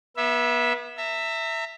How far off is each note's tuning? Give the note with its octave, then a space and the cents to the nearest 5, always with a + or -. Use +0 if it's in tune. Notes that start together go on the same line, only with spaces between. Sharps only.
B3 -35 E5 +0
E5 +0 A#5 -40